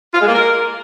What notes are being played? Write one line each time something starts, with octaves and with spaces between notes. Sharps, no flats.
F4
G#3
A#3
A#4